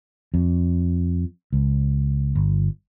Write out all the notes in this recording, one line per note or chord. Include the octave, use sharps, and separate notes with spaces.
F2
C#2
G1